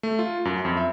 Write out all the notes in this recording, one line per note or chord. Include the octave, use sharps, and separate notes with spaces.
A3
F4
F#2
F2
E5